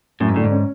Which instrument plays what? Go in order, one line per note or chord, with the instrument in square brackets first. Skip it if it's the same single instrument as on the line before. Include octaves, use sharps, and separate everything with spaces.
[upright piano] F#2 [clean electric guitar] A2
[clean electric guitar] G#2
[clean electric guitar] A2 [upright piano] D3
[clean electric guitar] G#2
[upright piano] C#4